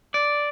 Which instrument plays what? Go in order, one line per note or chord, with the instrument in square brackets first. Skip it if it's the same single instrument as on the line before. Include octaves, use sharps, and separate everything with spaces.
[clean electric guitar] D5